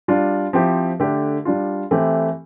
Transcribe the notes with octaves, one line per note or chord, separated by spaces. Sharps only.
G3 D4 F4
F3 C4 E4 G4
D3 A3 D4 G4
G3 D4 F4
E3 A3 C4 E4 G4